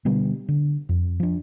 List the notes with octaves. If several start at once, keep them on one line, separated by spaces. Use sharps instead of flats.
B2 D3 G3 B3
D3
F2
F3 D4